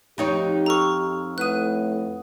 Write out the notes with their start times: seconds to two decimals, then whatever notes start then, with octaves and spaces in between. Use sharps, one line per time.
0.18 F2 D#4 G4 C#5
0.66 A4 A#5 C#6 E6 F6
1.38 A2 B4 F#5 D#6 F#6 D#7